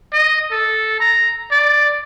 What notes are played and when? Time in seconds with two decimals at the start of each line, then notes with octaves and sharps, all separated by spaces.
0.13 D#5
0.51 A4
1.00 A#5
1.51 D5